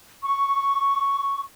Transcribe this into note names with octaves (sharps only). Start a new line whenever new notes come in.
C#6